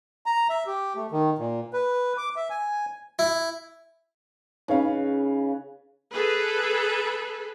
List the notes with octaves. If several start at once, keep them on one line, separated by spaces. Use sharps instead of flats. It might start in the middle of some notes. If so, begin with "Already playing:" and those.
A#5
E5
G4
A3
D#3
A#2
B4
D6
E5
G#5
E4
C#3 D#4 B4 C#5 F5
G#4 A4 B4